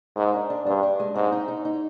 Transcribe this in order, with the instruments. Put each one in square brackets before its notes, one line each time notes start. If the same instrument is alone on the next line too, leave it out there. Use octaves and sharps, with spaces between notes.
[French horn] G#2 [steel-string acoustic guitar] A#4
[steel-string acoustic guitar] D4
D4
[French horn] G2 [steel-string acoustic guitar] D4
[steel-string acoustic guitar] D4
G#3
[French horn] G#2 [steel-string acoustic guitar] C4
[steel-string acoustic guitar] D#4
D#4
D#4